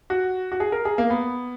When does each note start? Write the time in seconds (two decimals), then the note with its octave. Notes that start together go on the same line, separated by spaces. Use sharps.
0.10 F#4
0.52 F#4
0.60 G#4
0.72 A#4
0.85 G#4
0.98 A#3
1.10 B3